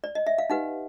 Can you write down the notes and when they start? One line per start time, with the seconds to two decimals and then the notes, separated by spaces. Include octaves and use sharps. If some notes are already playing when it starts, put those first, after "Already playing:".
0.04 D5
0.15 D#5
0.27 E5
0.38 F5
0.50 D#4 G4 B4 F#5